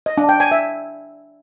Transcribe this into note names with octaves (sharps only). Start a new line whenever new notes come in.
D#5
D4
G5
G#5
E5